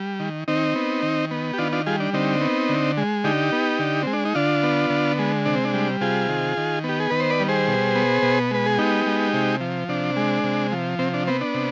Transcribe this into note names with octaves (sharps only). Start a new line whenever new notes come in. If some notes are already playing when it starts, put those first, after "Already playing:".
Already playing: G3
D#3
D#3 C4 D#4
B3
D#3
B3
G4
D#3 D4 F4
D4 F4
G3 F4 G#4
D4
D3 C4 D#4
B3
D3
G#3
D3 D#4 G4
B3
D3
G#3 C4
D4
D#4
D3 D4 F4
B3
D3
G#3
C3 D4
C4
D4
G3
C3 F4 G#4
D#3
D#3
B3 G4
G#4
D#3 B4
C5
B4 D5
G3
G#4 C5
B2
B3
B2
G#3 B4
G#4
B3 D#4 G4
G#3
C3
F3
C3 D4
G#3
C3
F3
C3 C4
D4
B3 C4
D4
C3